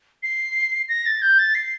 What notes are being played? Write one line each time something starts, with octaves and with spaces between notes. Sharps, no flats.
C7
A#6
A6
G6
A6
C7